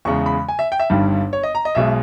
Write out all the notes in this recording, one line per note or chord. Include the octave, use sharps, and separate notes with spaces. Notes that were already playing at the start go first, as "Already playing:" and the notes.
E2 C#3 G#3 C#6
B5
G#5
E5
G5
E5
G1 G2 D#3 G3
C#5
D#5
A#5
D#5
B1 B2 G#3 E5